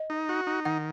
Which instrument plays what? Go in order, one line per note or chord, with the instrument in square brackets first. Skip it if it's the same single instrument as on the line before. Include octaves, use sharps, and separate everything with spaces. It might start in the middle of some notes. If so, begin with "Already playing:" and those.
Already playing: [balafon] D#5
[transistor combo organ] D#4
F#4
D#4
[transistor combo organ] D#3 [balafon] F#5